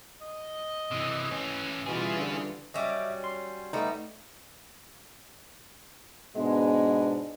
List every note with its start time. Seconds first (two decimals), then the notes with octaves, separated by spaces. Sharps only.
0.21 D#5
0.91 C3 E3
1.31 E3 C#4
1.86 B2 E3 G3 C#4 F4 G#4
2.17 D3
2.74 F#3 G3 C#4 D#5 E5 D6
3.24 C6
3.73 G3 A3 B3 D#4
6.36 G#2 B2 G#3 B3 D4